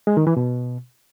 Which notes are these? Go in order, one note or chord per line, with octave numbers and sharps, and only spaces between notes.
G#3
D#3
E3
B2